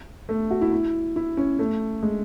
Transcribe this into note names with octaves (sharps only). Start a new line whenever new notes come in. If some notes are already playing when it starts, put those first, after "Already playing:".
A3
F#4
E4
E4
E4
C#4
A3
G#3